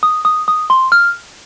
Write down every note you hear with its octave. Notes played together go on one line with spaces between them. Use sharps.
D#6
D#6
D#6
C6
F6